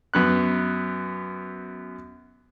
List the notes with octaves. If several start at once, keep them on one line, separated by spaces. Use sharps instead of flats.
F#2 B3 F#6